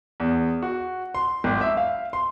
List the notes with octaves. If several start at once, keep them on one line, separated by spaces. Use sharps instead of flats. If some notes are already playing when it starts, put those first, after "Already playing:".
E2
F#4
C6
G#1
E5
F5
C6